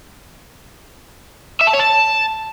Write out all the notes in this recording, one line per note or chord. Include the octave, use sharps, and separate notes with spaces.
E5
A5
C#5
A5